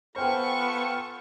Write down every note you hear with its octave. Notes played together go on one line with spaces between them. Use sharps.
B3 F4 A4 C5 G5 G#5 C#6 F6